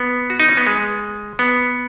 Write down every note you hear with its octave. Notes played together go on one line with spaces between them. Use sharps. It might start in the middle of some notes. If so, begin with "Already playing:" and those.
Already playing: B3
F#4
D#4
C#4
B3
G#3
B3